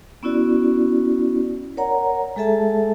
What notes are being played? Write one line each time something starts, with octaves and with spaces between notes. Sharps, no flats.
B3 C#4 E4 F#4 D5
A#4 C#5 D5 F#5 A#5
G#3 G#4 A4 E5 A5